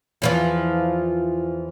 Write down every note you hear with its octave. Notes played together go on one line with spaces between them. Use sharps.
E2 E3 F3